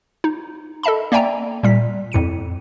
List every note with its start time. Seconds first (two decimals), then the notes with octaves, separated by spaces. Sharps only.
0.24 D#4
0.83 A4 D#5 E5 A5 B5
1.12 A#3 D5 E5 G5 G#5 A#5
1.63 A#2 G3 B6
2.12 F2 A2 C#7 D#7